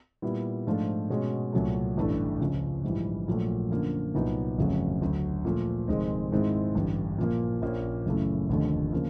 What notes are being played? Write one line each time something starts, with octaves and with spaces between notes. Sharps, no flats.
A#2 G3 B3 E4
G#2 F3 A3 D4 F4
B2 G#3 C#4 F#4
C2 A#2 F#3 A3
A1 G2 E3 A3 D4
C#2 C#3 F3
A#1 G#2 E3 G3
A#1 A#2 F#3 A3
F#2 D3 F3 A#3
C2 A#2 F#3 B3 D#4
G1 F2 C#3 F#3 A3
D2 D3 F#3
A#2 F3 A3
F1 D#2 D#3 G#3 C4
G#2 D#3 G#3 C4 E4
A1 G2 D3
A#2 F3 A#3
A#1 A#2 F3 A#3 C#4
F#1 F#2 C#3 E3 A3
F1 D#2 D3 F3 A3
C#3 F3 A#3